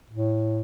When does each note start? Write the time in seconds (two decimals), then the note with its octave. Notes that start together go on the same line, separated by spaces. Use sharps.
0.10 A2